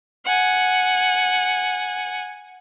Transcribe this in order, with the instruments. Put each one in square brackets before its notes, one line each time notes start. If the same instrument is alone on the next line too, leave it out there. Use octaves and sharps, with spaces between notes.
[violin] F#5 G#5